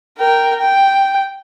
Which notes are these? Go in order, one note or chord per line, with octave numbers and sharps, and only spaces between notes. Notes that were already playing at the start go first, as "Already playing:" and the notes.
A#4 G5
G5